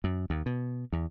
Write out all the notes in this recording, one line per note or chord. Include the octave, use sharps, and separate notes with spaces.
F#2
D#2
B2
E2